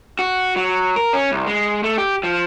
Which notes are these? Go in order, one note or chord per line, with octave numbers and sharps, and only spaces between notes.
F#4
F#3
A#4
C#4
C2
G#3
A3
G4
F3